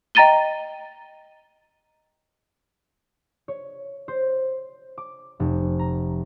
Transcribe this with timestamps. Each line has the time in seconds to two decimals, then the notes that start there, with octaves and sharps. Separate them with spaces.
0.15 D#5 G5 A#5 A6 D#7 G7
3.48 C#5
4.08 C5
4.98 D6
5.40 F1
5.79 A#5